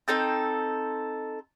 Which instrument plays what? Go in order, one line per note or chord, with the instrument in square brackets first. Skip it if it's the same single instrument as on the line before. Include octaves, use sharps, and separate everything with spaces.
[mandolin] C4 D#4 A4 G6